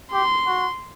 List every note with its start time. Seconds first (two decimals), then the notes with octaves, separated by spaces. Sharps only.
0.13 G4 C6
0.46 F#4